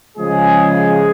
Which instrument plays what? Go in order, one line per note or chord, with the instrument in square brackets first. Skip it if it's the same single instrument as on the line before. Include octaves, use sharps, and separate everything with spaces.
[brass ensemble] C#3 F3 G#3 G#4